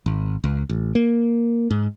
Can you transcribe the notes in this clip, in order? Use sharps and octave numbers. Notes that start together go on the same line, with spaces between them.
G#1
C#2
A1
A#3
G#2